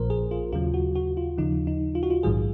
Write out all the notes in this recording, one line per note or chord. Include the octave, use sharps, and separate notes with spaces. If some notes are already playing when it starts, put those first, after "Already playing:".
Already playing: A#1 A#2 F3 A#4 C5
G#4
F4
D#2 C#3 F#3 F4
F#4
F#4
F4
D#2 C#3 F3 D#4
D#4
F4
F#4
F4
A#1 G#2 D#3 F#3 G#4